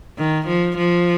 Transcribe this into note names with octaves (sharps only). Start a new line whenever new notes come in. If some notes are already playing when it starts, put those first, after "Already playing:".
D#3
F3
F3